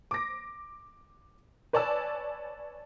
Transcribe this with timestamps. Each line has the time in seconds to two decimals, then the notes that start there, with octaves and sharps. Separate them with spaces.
0.11 D6 A#6
1.73 B4 C#5 D5 G#5 A5 E6